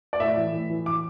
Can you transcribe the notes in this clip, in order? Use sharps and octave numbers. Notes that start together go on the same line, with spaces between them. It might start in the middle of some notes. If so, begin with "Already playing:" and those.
D5
A2 E5
E3
A2
E3
D6